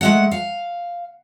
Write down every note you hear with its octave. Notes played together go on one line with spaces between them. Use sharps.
G#3 A3 F#5
F5